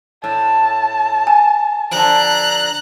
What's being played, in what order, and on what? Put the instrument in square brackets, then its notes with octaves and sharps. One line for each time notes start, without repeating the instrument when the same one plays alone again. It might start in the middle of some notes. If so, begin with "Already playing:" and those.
[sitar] A2 [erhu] A5
[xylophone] G#5
[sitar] D3 F3 [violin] A#5 F#6